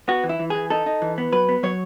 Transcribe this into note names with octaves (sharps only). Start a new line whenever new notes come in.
B3 F#4
E3
E4
E3
E3 G#4
D#4 A4
D#4
E3
B3
F#3 B4
B3
F#3 C#5